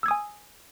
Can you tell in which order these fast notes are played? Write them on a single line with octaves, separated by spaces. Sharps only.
E6 G#6 D#6 G#5